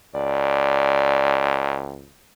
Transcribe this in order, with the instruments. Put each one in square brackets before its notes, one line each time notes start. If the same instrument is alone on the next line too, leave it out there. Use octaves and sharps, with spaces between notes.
[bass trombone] C#2 [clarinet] D5